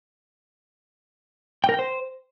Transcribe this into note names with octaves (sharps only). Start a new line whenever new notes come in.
G5
A#4
G5
C5